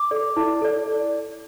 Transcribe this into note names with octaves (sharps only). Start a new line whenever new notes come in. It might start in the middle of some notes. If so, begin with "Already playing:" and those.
Already playing: D6
A4 D5
E4
A4 D5